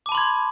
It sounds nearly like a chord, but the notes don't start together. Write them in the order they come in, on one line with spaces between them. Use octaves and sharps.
D6 A5 B5 C6 G#6